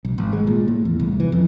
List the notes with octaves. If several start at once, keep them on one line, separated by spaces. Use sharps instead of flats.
B1
G#1
G#3
A#2
A2
E2
C2
E3
F2